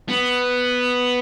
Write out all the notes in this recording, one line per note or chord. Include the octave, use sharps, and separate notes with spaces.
B3